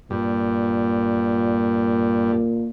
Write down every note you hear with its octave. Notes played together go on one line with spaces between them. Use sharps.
G2 A#2